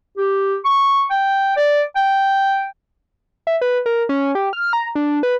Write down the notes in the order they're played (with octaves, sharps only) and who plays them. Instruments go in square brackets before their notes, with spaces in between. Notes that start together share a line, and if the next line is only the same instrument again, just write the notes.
[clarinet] G4
C#6
G5
D5
G5
[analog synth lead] E5
B4
A#4
C#4
G4
F6
A#5
D4
B4